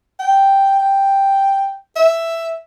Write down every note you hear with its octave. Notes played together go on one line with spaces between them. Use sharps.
G5
G5
E5